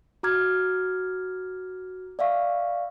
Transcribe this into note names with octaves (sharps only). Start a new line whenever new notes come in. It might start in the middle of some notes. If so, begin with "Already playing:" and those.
F#4 A#5 D6 F6 G#6
D5 E5 F5 C#6